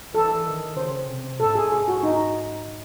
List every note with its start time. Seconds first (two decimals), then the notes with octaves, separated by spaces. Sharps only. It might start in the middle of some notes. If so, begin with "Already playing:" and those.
0.13 E3 A4
0.45 D#3
0.77 C#3 C5
1.09 C3
1.40 G#2 A4
1.55 G#4
1.72 G#4
1.88 F#4
2.03 D#4